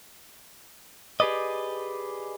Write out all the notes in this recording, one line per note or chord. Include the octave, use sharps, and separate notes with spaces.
G4 G#4 B4 D5 D#5